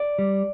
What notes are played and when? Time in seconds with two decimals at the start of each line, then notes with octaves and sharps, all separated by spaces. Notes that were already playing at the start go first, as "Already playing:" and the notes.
Already playing: D5
0.19 G3